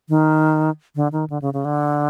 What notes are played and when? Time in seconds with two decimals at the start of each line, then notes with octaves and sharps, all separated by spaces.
0.09 D#3
0.95 D3
1.13 D#3
1.30 D3
1.42 C#3
1.54 C#3
1.65 D3